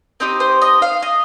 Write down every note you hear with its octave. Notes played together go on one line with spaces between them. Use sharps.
C4 D#4 G4 C5
C5
D#5
F5
D#5